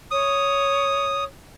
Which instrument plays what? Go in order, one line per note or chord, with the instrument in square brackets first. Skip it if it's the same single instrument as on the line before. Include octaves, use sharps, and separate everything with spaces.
[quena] C#5 [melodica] D#6